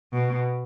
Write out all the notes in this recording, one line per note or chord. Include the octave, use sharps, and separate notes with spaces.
B2